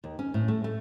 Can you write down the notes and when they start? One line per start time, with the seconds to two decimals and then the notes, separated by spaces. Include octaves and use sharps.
0.04 D#2
0.19 C#4
0.34 A2
0.48 A3
0.64 A3